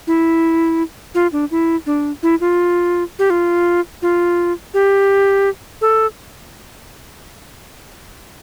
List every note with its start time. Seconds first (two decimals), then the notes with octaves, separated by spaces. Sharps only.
0.07 E4
1.15 F4
1.33 D4
1.51 E4
1.86 D4
2.23 E4
2.40 F4
3.19 G4
3.30 F4
4.02 F4
4.74 G4
5.81 A4